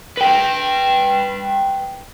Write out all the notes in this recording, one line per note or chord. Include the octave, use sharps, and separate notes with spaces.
B4 G5